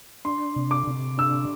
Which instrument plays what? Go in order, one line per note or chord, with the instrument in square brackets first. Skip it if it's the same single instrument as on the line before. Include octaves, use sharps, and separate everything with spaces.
[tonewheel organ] D4 [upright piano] C6
[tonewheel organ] C3
[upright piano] D6
[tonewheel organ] C3
[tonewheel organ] D4 [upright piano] E6